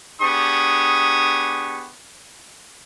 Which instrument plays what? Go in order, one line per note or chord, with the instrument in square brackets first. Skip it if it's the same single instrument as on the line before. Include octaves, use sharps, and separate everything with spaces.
[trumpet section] B3 D4 G4 G#4 C#6 D#6